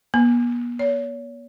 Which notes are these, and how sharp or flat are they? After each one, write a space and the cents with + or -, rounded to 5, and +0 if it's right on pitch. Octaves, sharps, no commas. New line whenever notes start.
B3 -40
C#5 +35